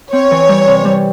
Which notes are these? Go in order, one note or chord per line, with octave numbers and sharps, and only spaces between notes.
C4 C#5
E3
G3
C3
G3